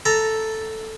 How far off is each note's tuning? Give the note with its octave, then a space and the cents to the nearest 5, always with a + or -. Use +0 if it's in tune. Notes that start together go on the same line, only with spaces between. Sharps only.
A4 +0 A#5 +0